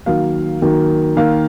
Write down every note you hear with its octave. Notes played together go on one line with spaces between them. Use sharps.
D#3 F#3 A#3 F5
D#3 F#3 A#3
D#3 A#3 F5